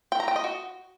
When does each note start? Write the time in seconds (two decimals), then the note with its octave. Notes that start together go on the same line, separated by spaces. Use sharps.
0.12 G5
0.20 A#5
0.28 G5
0.36 D#5
0.44 F#4